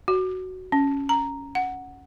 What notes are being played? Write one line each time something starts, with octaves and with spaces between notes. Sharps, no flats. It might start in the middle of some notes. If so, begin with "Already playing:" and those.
F#4
C#4
A#5
F#5